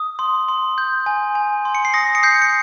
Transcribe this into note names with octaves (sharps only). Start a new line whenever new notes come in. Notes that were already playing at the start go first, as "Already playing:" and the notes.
Already playing: D#6
C6
C6
G6
G#5
G#5
C6
C#7
C7
D#6 A#6
C#7
G6 C7
C#7